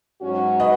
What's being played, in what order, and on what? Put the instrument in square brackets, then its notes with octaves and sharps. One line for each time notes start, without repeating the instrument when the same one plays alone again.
[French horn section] G#2 F#3 C#4 F#4
[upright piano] B4 D#5